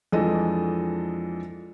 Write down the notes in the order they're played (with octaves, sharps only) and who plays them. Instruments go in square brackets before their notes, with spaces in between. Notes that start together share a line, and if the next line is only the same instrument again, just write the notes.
[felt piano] F2 E3 G#3 D4 A4 D#5